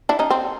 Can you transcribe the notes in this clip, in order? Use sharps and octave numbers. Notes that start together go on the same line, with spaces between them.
D4 E4
C#4 D#4
C4